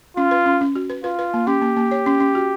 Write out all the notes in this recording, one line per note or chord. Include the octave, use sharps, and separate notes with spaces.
C#4 F4
B4
C#4
C#4
F#4
B4
F4 B4
B4
A#3
C#4 G4
A#3
A#3
C#5
C#4
C#4
F#4